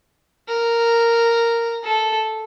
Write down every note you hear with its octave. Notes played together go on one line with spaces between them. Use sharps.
A#4
A4